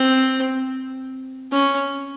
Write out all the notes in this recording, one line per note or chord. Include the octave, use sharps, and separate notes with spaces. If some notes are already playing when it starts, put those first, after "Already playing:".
Already playing: C4
C#4